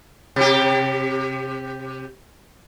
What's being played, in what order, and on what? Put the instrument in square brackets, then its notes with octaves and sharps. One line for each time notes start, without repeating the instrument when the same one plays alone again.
[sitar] C3 G4